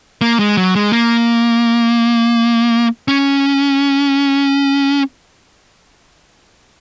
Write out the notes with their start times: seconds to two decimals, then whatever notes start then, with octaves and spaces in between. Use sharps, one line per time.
0.21 A#3
0.39 G#3
0.57 F#3
0.75 G#3
0.93 A#3
3.08 C#4